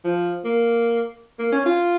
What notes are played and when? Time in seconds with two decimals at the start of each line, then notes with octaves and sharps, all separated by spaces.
0.04 F3
0.45 A#3
1.39 A#3
1.52 C#4
1.66 F4